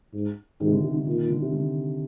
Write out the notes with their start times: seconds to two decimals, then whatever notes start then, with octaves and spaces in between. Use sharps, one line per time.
0.14 G#2
0.60 G#2 D#3
0.67 C3
0.72 D3
0.84 C3
0.94 D3
1.07 A#2 D#3
1.18 D#3
1.30 D3
1.42 C3
1.53 D3